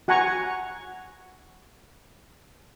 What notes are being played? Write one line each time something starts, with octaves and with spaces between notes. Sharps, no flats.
F#4 F#5 G#5 A#5 C#6